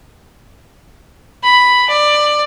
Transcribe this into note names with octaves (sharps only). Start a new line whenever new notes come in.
B5
D5